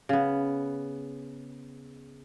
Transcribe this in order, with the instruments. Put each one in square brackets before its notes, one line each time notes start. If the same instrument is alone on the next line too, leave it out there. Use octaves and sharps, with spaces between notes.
[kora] C#3 B3